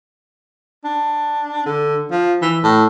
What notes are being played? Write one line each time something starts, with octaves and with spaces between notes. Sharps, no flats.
D4
D3
F3
E3
A2